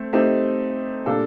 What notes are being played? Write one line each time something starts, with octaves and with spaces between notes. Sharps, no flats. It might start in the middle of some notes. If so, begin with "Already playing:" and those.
Already playing: A3 C4
A3 C4 D#4 G4
A#2 G3 D4 A4